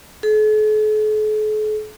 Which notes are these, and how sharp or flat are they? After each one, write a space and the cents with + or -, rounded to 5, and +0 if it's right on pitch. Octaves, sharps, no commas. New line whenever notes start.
A4 -45